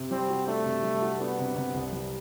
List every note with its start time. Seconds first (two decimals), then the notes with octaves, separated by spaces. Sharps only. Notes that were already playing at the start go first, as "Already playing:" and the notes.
Already playing: C3
0.11 G3 C4
0.30 F#4
0.47 A3 D4
0.66 C3
0.83 G3
1.01 F#4
1.20 B3 D4
1.39 C3
1.56 C3
1.74 C2
1.92 G3